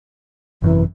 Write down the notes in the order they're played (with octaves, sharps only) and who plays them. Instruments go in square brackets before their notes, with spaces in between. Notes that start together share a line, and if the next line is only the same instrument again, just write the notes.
[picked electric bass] G#1 F#2 C3 [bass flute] E3